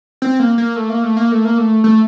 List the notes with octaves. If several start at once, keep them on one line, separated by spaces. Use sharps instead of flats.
C4
A#3
A#3
A3
A#3
A3
A#3
A3
A#3
A3
A3